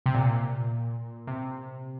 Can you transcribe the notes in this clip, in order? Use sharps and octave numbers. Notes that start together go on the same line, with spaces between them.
C3
A#2
C3